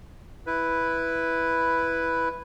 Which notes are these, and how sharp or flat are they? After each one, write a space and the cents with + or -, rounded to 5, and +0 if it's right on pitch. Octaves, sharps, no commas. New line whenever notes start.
E4 +0 B4 +0